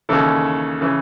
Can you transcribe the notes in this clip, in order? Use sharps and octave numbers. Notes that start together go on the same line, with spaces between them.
D#2 C#3 E3 A4
C#3 E3